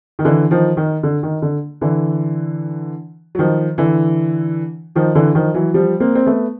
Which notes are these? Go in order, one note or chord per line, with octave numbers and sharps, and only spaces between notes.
D#3
D3 E3
D#3 F3
D#3
D3
D#3
D3
D3 E3
F#3
D#3 F3
D3 E3
D#3 F3
D3 E3
D#3 F3
E3 F#3
F3 G3
A#3 C4
C4
A3 B3